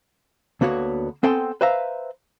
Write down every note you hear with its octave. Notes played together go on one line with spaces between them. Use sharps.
D2 A#3 B3 F#4 C#5
B3 C4 A4 G5 G#5 C6
B4 C5 E5 F5 A#5